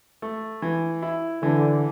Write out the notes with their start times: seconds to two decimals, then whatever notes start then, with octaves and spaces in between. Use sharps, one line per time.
0.22 A3
0.62 E3
1.02 E4
1.42 D3 E3